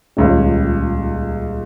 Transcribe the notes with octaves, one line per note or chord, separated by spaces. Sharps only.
D#1 C#2 C#5